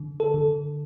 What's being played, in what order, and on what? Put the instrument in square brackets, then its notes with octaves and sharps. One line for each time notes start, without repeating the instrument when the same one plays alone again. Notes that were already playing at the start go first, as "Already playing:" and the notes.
Already playing: [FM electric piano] D3
A4
D3